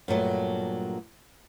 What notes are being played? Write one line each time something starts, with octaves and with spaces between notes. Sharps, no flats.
G2 A#2 F#3 A3